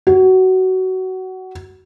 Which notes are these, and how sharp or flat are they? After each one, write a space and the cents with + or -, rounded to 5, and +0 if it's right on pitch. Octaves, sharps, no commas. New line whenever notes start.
F#4 +20